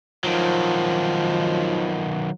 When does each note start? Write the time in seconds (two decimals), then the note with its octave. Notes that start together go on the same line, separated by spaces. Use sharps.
0.24 D#3 F3 F#3